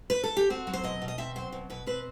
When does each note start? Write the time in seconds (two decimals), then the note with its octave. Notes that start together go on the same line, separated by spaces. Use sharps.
0.10 B4
0.24 A4
0.37 G4
0.50 C4 F#4
0.67 F#3
0.73 C5
0.84 B2 D#5
1.02 B2
1.08 D#5
1.18 C4 E5
1.36 F#3 C5
1.52 B2
1.70 B2 B4
1.86 C4 B4